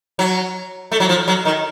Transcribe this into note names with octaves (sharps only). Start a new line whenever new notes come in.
F#3
A3
F#3
F3
F#3
D#3